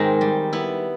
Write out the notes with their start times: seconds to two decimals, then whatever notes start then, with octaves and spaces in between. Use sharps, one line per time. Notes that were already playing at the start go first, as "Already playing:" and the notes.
Already playing: G#2 D#3 G#3 C4 D#4
0.21 G3
0.53 B3 E4